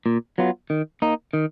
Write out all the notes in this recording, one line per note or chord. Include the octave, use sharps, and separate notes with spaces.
A#2
F#3 B3 F4
D#3
A#3 D#4
D#3